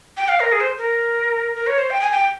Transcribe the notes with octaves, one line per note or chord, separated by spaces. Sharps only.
G5
F5
A#4
G#4
C5
A#4
A#4
C#5
C5
G5
G#5
G5